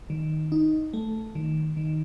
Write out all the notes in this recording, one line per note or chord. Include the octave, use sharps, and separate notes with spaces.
D#3
D#4
A3
D#3
D#3